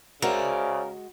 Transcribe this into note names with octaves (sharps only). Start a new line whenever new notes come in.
C#3 G#3 F#4 A#4 C5 D5 E5